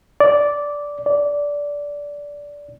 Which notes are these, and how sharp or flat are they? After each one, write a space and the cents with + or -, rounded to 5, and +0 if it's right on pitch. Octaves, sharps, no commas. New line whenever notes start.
D5 -10
D5 -15